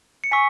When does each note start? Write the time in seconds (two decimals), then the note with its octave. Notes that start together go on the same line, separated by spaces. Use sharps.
0.24 C#7
0.32 G#5 C#6 E6 B6